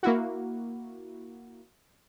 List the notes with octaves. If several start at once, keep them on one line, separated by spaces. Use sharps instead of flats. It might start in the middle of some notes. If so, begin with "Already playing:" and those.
A#3 E4 F#4